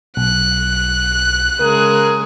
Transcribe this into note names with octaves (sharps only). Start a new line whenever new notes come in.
B1 F#6
C#3 G#3 G#4 A#4